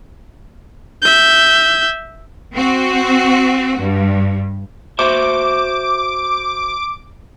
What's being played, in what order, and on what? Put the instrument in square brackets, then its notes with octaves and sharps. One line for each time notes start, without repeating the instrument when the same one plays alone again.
[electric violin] E5 G6
[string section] C4 F#4
G2
[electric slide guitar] F#4 C5 E5 [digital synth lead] D6